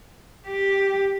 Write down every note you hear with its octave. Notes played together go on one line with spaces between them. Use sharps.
G4